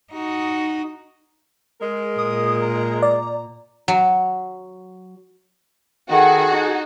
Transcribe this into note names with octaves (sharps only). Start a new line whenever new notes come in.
D#4 F#4
G#3 A#4
A#2 D#6
A#5
D5
F#3
D#3 F#4 G#4 A4 F#5
D#4